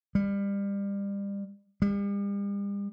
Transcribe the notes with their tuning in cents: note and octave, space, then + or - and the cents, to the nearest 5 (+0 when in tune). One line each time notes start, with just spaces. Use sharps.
G3 +30
G3 +45